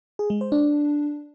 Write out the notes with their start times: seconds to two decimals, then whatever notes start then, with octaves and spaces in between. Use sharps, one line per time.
0.19 G#4
0.30 G#3
0.41 C5
0.52 D4